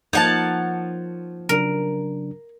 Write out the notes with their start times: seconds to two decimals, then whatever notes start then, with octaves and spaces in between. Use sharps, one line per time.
0.13 F3 A#3 D#4 C#5 F#5 A5 G6
1.49 C#3 F#3 D4 A#4